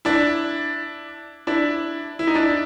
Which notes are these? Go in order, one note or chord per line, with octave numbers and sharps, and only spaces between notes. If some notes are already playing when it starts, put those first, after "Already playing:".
D4 E4
D4 E4
E4
D#4
D4 E4